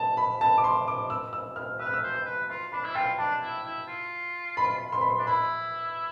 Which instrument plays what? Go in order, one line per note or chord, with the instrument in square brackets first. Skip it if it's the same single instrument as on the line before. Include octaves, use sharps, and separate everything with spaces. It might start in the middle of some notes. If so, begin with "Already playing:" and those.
Already playing: [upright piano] A5
B5
A5
D6
C6
D6
E6
E6
F6
[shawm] B4 [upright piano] E6
[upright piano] F6
E6
[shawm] C5
[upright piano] E6
[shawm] B4
[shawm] F4 [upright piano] C6
[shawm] D4 [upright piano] B5
[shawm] E4
[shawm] F4 [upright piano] G5
[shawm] D4 [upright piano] A5
[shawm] E4
E4
F4
[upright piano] B5
C6
B5
C6
[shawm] D4
[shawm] E4 [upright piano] B5